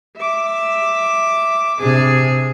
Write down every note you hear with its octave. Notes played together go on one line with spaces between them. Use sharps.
E5 D6
C3 D4 G#4